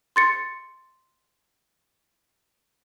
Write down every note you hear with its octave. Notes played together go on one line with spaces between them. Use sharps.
C6 A6 C#7